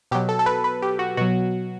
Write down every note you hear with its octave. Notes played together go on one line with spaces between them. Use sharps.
B2 F#3 G4
A4
A4
B4
B4
G4
F#4
B2 F#3 F#4